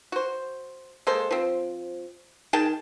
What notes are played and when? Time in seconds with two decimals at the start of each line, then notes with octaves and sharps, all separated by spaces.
0.12 F#4 C5
1.07 G#3 A#3 A4 C5
1.31 F3 C4
2.53 D#3 G#4 G5 A5